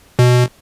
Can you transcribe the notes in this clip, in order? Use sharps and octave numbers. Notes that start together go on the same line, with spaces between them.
B2